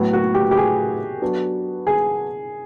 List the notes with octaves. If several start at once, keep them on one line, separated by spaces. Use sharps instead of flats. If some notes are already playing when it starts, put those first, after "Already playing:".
Already playing: A2 F#3 B3
F#4
G4
G4
G#4
F#3 B3 D4 F#4 A4
G#4